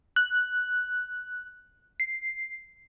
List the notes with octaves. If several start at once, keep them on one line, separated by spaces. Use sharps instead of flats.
F#6
C7